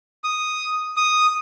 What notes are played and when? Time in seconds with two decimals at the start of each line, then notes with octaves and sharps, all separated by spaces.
0.24 D#6
0.96 D#6